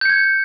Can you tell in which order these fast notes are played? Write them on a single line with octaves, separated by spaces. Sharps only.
G6 C#7 G#6